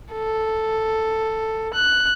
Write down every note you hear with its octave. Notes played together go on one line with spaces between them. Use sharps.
A4
F#6